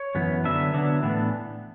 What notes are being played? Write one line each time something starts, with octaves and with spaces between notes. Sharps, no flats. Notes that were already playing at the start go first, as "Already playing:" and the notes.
Already playing: C#5
F#2 E3 B3
D3 F#3 B3 D4 E5
D3 F#3 B3 D4
A2 E3 B3 D4